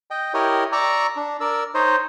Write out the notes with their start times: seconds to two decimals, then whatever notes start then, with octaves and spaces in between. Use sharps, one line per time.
0.11 D#5 G5
0.34 E4 G4 A#4 C#5 D#5
0.72 D5 A#5 C#6 D6 E6
1.16 D4
1.41 A#4 D5 E6
1.75 D#4 C5 C#5 D#5